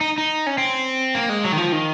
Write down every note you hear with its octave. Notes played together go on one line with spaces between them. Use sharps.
D#4
D#4
C#4
C4
A#3
G#3
F#3
D#3
F3
D#3